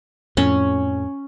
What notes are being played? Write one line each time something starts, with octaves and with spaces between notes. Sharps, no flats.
F2 A2 C#4